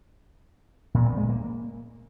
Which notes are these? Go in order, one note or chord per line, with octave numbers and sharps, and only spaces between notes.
A#2
B3
G#3
A#3